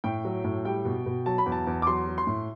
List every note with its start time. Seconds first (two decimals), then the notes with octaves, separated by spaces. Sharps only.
0.04 A2 G5
0.25 F#3
0.44 A2
0.65 G3 G5
0.85 B2
1.06 B2
1.26 F#3 A5
1.38 B5
1.46 E2
1.52 A5
1.67 E2
1.82 D6
1.87 F#3 C6
2.07 F#3
2.18 C6
2.27 A2